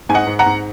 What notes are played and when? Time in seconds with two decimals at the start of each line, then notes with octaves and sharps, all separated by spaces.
0.09 G#2 G#5
0.14 D#5 F#5
0.27 G#2
0.39 F#5 A#5
0.46 G#2